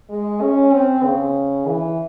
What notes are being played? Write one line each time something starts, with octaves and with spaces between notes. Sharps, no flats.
G#3
C#4
C4
C#3
E3